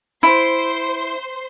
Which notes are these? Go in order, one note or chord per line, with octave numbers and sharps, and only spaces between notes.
E4 C5 C6